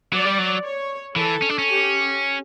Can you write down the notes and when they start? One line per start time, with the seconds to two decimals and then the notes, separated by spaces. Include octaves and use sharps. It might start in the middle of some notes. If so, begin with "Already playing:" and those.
0.13 F#3 D5
0.25 G3
0.38 F#3
0.64 C#5
1.16 E3 A4
1.42 C#4
1.49 D4
1.59 C#4
1.68 G4